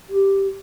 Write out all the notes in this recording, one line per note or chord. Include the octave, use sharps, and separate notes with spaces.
G4